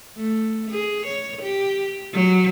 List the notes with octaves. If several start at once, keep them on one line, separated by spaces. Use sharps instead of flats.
A3
G#4
C#5
G4
F#3